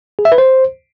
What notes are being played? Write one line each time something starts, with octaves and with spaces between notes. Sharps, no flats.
G#4
E5
B4
C5